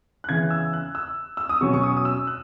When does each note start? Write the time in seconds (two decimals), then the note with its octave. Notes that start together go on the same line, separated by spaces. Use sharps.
0.24 F#6
0.29 C#3 E3 B3 G#6
0.50 E6
0.73 F#6
0.95 E6
1.37 E6
1.49 D#6
1.61 B2 F#3 C#4 C#6
1.73 C#6
1.83 D#6
1.97 D#6
2.05 E6
2.27 F#6